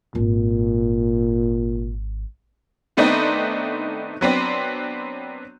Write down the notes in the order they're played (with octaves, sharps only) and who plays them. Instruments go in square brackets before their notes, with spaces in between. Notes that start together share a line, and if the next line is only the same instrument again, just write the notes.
[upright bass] G#1 [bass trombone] A#2
[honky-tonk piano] D#3 A3 B3 C4 D4 D#4
F#3 B3 C4 D4